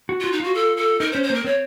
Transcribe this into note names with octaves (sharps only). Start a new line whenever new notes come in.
F#4
F4 F#4
D#4
F4 F#4
A4
A4
D#4 A#4
C5
C#4
C5
A#3 A#4
C4 C#5